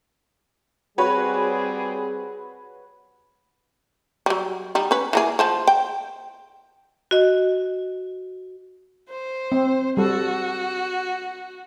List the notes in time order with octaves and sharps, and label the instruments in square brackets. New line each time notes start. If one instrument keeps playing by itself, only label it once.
[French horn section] G3 C4 G#4 [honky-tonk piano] F#4 B4 C#5
[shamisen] F#3 G3
G3 D#4
C#4 B4
E3 A#3 G#4
F3 C5 A5
G5
[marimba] F#4 D#5
[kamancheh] C5
[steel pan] C4
[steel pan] G3 A4 [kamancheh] F#4